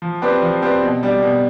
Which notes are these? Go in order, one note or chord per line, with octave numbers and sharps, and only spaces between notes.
F3
C4 G4 B4 D5
F3
C4 G4 B4 D5
B2
G3 D4 G4
B2